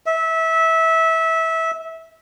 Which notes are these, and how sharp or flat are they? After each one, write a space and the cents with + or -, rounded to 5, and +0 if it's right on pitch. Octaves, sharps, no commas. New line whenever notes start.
E5 -20